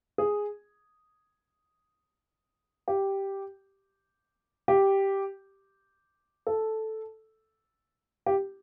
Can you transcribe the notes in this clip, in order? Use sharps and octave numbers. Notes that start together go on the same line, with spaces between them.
G#4
G4
G4
A4
G4